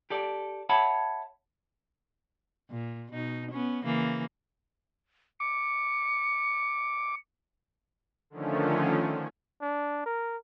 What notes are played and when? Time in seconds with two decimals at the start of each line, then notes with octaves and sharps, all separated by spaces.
0.10 G4 A4 D5
0.69 C#5 E5 F#5 A5 B5
2.71 A#2
3.11 B2 D#4
3.51 B3 C#4
3.84 C#3 E3 A#3
5.40 D6 C#7
8.30 D3 D#3 F3 A3 C#4
9.62 D4
10.06 A#4